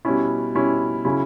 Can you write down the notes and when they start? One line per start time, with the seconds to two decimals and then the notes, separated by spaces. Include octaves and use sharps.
0.05 B2 G3 C#4 E4
0.55 B2 G3 C#4 E4
1.05 C#3 F#3 C#4 E4